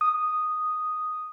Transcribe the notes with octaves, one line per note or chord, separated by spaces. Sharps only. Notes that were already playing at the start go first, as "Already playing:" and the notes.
D#6